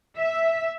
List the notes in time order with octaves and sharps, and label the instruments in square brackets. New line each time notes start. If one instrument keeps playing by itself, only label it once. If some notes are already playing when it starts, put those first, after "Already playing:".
[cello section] E5